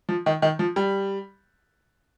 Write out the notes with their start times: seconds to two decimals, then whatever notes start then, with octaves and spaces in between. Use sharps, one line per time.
0.09 F3
0.26 D#3
0.42 D#3
0.59 F3
0.76 G3